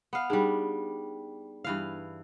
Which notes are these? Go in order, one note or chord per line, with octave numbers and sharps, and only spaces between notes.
B3 F5
G3 D4 D#4 G#4
G2 E3 F5